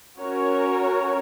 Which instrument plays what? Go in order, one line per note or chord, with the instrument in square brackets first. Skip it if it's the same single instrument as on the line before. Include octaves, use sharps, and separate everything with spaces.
[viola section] C#4 F#4 A#4 C#5